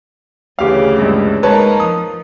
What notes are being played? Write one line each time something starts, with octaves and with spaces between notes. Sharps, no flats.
D2 C#3 E3 G4 F5
C#2 G2
G#3 A#3 D#4 B4 C#5 A5
F3 D#6